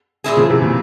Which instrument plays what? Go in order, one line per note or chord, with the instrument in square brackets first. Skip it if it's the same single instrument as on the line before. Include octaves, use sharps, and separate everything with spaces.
[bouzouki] A#2 G#3 E4 G#4
[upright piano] C#3 F3
C3 E3
A#2 C#3